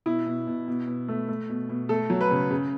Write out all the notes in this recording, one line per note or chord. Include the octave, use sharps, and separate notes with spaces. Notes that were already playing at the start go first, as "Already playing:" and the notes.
B2 E4
B2
B2
B2
B2
A3
A3
B2
B2
A3 A4
F#3
B4
C#3
C#3